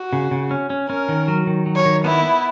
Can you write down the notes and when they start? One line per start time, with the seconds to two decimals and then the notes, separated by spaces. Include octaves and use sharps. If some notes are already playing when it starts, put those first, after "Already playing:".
Already playing: F#4
0.13 C#3
0.31 C#3
0.51 C#4
0.70 C#4
0.89 C#4 A#4
1.09 D#3
1.28 F#3
1.47 D#3
1.66 F#3
1.76 C#5
1.85 D#3
2.04 B3 E4
2.24 B3